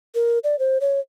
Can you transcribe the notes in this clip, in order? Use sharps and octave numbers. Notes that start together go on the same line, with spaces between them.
A#4
D5
C5
C#5